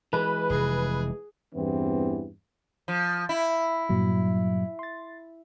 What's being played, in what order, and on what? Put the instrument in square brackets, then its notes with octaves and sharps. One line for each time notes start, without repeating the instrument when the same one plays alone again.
[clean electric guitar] E3 G#3 [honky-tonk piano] B4
[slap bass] F1 C3 [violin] G#4
[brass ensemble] E2 G2 E3 B3 C4
[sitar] F3
E4
[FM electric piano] G2 A#2 F#3
C6 A6